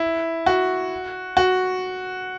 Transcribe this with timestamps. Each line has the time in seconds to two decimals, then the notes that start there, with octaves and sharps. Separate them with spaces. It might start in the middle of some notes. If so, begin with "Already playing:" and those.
Already playing: E4
0.46 F#4
1.37 F#4